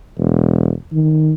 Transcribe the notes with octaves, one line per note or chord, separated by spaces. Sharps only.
E1
D#3